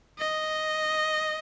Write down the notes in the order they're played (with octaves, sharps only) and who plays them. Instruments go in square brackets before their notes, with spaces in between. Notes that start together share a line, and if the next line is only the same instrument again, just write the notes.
[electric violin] D#5